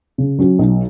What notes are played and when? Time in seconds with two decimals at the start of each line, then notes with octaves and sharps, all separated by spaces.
0.18 C#3
0.39 F#3 C#4 F#4
0.59 B1